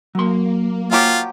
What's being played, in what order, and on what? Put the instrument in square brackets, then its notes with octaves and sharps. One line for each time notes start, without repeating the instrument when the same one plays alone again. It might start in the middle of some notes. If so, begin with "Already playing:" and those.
[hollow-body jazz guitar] F#3 C6 [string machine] A#3
[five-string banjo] F3 F#3 G4 [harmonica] F4